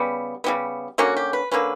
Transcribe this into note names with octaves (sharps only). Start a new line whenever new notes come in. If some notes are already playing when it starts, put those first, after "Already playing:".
Already playing: C#3 G3 B3
C#3 G3 B3
D3 A#3 C#4 F#4
G4
B4
D3 A#3 C#4 B4